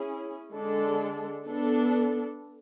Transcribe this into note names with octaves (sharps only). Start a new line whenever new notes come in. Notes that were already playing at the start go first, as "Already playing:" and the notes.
Already playing: C#4 E4 G#4
D3 G#3 D4 A4
B3 D4 A4